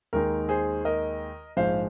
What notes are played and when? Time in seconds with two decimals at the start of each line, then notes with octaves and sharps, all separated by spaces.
0.13 D#2 D#3 G#3 D#4 A#4
0.49 G#4 C5
0.85 A#4 D#5
1.57 A#1 G#2 F3 G#3 C5 F5